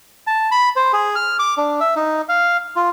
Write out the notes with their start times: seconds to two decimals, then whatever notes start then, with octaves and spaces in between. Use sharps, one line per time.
0.27 A5
0.51 B5
0.76 C5
0.93 G#4
1.16 F6
1.39 D6
1.58 D4
1.80 E5
1.96 D#4
2.29 F5
2.76 F4